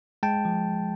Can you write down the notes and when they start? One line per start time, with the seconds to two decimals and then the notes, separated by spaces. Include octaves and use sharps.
0.23 G#3 G5 A5
0.45 F3